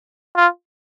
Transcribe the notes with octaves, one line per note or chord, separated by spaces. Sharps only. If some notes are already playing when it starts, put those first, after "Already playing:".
F4